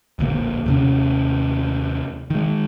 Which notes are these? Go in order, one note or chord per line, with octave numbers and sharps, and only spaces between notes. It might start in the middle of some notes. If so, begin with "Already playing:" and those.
D1 A#1 D3 A#3
D#2 C3 C#4
D#3 G#3